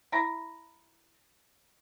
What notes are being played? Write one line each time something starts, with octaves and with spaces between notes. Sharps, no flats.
E4 A#5